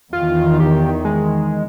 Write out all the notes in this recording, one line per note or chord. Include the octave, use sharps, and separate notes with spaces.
E2 D#3 F4
G4
G#3